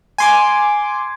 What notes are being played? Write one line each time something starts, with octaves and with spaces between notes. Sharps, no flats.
G#5 C6 D6